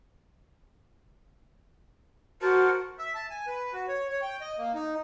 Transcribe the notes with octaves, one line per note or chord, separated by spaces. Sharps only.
F#4 A#4 C5 A5
E5
A5
G#5
B4
F#4
C#5
C#5
G5
D#5
A#3
D#4